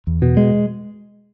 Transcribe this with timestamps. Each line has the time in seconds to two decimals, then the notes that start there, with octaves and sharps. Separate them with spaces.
0.07 E2
0.22 B2
0.37 G#3